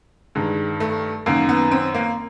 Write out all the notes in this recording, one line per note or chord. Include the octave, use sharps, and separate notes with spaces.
G2 D#3 G#3
A3
F#2 D#3 A#3
B3
C4
A#3